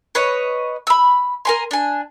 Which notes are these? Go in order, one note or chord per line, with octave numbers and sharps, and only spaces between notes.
B4 C#5 D#5
B5 E6
A#4 G#5 C6
D4 G#5